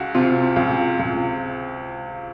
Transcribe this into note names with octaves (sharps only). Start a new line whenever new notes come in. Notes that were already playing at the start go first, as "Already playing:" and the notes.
Already playing: C#2 F#4
C3 F4
C#2
C#2